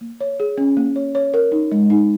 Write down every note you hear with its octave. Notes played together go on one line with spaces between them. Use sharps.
A#3
C#5
G#4
C#4
A#3
C#5
C#5
A#4
D#4
G#3
D#4